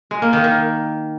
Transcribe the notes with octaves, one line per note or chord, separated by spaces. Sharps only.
G#3
A#3
D#3
D#3